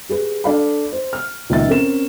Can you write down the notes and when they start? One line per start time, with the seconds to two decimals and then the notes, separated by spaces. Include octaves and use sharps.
0.09 G4 G#4 B4
0.44 D4 A4 D5 F5 G5 B5
0.93 C5
1.13 F6
1.50 C#2 A#2 D#3 E5 A6
1.68 C4 C#4 A#4 E7